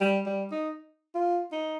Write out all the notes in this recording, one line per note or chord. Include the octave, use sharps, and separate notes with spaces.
G3
G3
D#4
F4
D#4